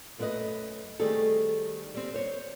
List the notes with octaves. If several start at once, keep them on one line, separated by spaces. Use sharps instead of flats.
F#2 A3 B3 F#4 B4 D#5
D#3 G3 A3 C4 G#4 A4
G3 C4
C5 C#5